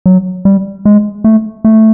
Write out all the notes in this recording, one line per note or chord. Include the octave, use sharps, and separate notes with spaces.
F#3
G3
G#3
A3
A3